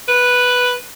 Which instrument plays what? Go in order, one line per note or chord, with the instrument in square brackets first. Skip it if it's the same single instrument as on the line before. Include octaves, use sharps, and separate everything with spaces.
[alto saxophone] B4